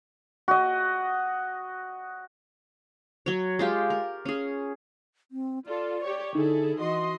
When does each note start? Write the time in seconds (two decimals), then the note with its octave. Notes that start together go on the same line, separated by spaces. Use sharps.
0.48 F#4 D#5
3.26 F#3 C#5
3.59 G#3 F4 G4
3.90 A#4
4.25 C#4 G#4
5.31 C4
5.67 F4 A4 D5
6.03 G4 C#5
6.35 D3 D#4 E4 G#4 A4
6.79 E3 F#4 D#5 C6